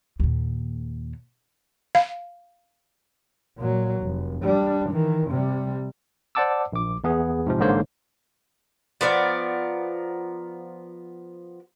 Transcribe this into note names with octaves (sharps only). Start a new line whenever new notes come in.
D#2 A#2
F5
A#2 F#3
F1
G3 D4
D#3 E3
C3 G3
C5 D5 F#5 A5 D6 E6
A#1 D6
E2 B3 G#4
G#2 C3 F3
A1 G#2 D3 A#3 C5 C#5
F3 B3 A#4 D5